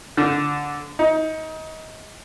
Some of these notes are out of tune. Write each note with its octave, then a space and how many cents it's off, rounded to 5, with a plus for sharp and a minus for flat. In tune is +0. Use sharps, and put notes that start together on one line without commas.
D3 -10
D#4 +25